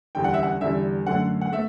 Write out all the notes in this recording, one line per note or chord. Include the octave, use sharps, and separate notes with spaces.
E2 D3 G3 G5
F#5
E5
F#5
E2 D3 G3 E5
F#2 D3 A3 F#5
F#5
A3 E5